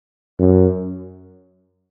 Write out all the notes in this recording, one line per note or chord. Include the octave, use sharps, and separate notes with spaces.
F#2